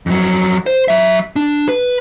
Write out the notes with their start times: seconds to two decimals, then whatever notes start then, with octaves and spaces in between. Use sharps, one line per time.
0.06 F2 F#3
0.66 C5
0.88 F#3 E5
1.36 D4
1.69 B4